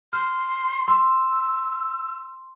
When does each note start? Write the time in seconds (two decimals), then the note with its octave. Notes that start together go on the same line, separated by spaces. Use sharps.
0.13 C6 F6
0.88 C6 E6